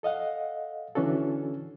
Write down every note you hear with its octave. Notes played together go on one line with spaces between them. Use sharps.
A4 D#5 F5 F#5
D3 E3 C#4 D4 F#4 A4